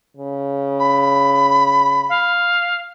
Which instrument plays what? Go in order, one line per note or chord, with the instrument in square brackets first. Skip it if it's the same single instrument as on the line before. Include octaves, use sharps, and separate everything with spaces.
[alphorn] C#3
[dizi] B5
[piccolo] F5